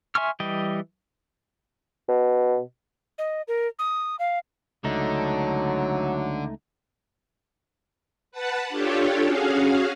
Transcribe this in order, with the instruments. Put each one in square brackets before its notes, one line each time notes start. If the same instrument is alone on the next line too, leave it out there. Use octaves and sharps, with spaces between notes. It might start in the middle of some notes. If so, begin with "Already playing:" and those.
[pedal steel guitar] E5 G#5 C6 C#6 F6
E3 G3 D#5 G5
[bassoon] B2
[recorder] D#5
A#4
D#6
F5
[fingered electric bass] C#2 [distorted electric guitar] D3 [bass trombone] F#3 [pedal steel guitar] A3 D#4
[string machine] B4 F#5 A5
D4 F4 G4 A4 C#5
C#4 F#4 G#4 F5